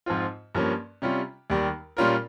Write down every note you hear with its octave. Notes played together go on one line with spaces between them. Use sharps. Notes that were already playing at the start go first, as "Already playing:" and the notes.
G#2 F3 C4 F4
G2 F3 A#3 C#4
C3 G3 C#4 F4
D#2 D#3 G3
A#2 G3 C#4 F4 A#4